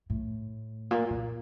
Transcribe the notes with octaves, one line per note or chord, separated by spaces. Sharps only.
A2
A#2
A#2